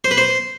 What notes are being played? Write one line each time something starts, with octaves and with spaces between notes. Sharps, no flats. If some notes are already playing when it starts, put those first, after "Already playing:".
C5
B4
C5